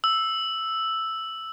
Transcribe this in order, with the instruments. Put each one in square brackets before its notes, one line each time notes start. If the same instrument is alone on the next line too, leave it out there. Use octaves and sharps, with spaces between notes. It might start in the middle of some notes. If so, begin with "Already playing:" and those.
[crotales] E6